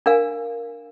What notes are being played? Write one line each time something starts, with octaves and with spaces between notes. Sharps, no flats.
D4 A#4 F5 G#5